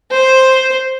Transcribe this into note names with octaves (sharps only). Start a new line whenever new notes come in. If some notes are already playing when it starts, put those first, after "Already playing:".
C5